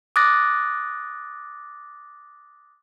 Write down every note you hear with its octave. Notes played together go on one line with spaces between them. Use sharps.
D6 D#6 F#6 A6 A#6